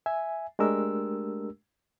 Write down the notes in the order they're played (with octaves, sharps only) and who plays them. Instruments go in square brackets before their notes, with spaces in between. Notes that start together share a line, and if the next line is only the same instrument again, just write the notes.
[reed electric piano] E5 G#5
G#3 A3 D4 G4 A#4 E6